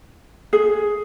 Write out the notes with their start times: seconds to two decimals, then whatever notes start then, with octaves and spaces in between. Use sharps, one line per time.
0.53 G#4